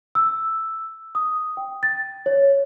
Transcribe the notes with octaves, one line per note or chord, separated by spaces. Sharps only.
E6
D#6
G5
A6
C#5